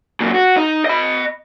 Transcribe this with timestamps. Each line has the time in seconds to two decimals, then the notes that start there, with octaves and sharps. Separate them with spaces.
0.21 F#2 A#2
0.34 F#4
0.57 D#4
0.86 D#5 B5